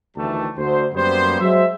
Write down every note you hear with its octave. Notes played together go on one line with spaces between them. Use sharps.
D2 D#3 E3 G3 A3 A5
D2 C5
F#2 G3 A#3 B3 C5
F#3 G#3 C5 E5